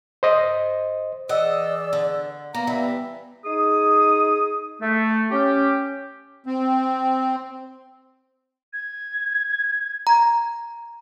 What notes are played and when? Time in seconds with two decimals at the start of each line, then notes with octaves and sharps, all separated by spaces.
0.23 C5 D#5
1.29 E3 G#4 D5 D#5 F#5 E6
1.93 D3
2.54 A#3 B3 A#5
2.67 E3 G3 E5
3.44 D#4 G#4 D#6
4.80 A3
5.30 C#4 G4
6.46 C4
8.73 G#6
10.07 A#5